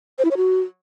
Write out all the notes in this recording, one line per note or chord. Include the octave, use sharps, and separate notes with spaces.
C5
E4
C#5
F#4